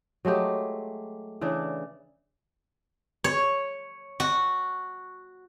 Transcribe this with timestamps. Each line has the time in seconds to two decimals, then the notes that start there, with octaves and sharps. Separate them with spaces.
0.25 F#3 G#3 A3 G4
1.41 C#3 E3 D4 D5
3.24 C#5
4.20 F#4